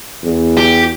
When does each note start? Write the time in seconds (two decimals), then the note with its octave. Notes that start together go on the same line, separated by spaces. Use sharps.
0.23 E2
0.57 G4